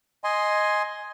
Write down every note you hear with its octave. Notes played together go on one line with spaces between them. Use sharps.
D#5 G#5 C6